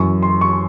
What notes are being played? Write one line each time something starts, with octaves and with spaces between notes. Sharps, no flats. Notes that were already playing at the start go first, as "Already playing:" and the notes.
Already playing: F#2 E3 C#6
C6
C#6